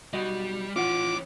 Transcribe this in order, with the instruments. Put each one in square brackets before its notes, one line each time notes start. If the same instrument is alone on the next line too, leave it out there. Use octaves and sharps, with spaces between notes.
[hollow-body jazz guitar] B1 F#4 D#5 [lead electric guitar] G3
[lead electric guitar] E3 C#4 [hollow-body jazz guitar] F4 F#5 [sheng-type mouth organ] D6